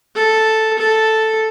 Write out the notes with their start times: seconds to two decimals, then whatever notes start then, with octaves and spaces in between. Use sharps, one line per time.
0.15 A4
0.78 A4